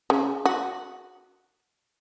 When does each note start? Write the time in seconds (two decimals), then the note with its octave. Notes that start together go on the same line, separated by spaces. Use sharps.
0.10 C#3
0.46 F#4